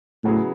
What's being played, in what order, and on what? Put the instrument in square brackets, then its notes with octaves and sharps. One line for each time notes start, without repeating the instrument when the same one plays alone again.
[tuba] A2 [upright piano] C#3 F#3 B3 E4 G#4